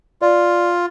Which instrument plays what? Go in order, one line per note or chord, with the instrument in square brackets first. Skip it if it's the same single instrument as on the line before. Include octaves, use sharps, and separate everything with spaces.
[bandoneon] F4 [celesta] D5